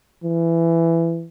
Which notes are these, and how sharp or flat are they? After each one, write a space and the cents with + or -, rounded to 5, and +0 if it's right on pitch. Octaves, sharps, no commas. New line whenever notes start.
E3 +15